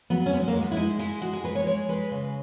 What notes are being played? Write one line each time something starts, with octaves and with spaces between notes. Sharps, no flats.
F#3 B3
C#4
G#3 B3
A#3
G#3
B3
E4
G#3 D#4
G#3 E4
G#3 F#4
G#4
G#3 B4
C#5
G#3 C#5
G#3 B4
C#3